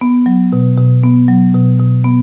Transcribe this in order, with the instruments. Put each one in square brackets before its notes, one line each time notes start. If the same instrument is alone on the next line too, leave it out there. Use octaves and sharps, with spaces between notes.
[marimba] B3
F#3
B2
B2
B3
F#3
B2
B2
B3